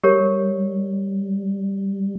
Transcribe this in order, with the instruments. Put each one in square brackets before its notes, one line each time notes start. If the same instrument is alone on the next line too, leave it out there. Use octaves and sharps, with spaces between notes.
[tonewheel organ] G3 [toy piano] G4 A#4 C#5